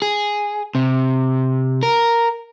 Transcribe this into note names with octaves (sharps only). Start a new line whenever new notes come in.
G#4
C3
A#4